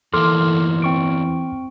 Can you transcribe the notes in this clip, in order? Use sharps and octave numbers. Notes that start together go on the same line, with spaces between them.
E2 E3 A#3 A4 C6 D6 F6
C4 C#6 D7